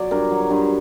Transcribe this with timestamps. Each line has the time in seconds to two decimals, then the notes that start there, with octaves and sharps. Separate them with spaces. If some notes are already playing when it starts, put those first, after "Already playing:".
Already playing: F#3 D5
0.11 G2 A#4
0.31 F#3
0.50 G2